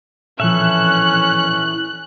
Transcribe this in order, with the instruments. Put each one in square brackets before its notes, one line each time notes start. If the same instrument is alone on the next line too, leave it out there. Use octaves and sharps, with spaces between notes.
[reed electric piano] A#2 F3 [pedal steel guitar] E3 A4 E5 [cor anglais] C#4 [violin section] F#6